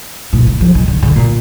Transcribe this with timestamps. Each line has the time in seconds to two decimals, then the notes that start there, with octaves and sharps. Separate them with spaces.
0.33 A#2
0.47 D3
0.61 F3
0.75 D#3
0.88 D3
1.03 D3
1.16 A#2